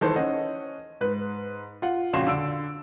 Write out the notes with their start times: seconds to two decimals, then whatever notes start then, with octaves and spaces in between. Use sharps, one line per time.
0.01 D#3 E3 A4 C5
0.16 C#4 D#5 F#5
1.01 G#2 B4
1.82 F4 F#5
2.13 F2 A#2 C#3 F#4 C6 E7
2.27 D3 E6 D7